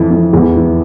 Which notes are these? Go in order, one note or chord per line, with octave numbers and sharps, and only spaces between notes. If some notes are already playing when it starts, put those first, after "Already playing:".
Already playing: F2 E3
F2
E2
E3